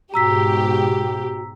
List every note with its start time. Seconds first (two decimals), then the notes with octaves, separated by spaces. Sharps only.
0.14 G#2 B2 F#4 G4 A#5 E6 B6